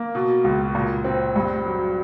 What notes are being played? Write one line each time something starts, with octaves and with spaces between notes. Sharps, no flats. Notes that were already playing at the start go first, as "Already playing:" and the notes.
Already playing: A#3
B2
C#2
A#2
C4
G2
F#3